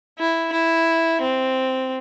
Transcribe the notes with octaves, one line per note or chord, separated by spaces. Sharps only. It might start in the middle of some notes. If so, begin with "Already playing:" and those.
E4
E4
C4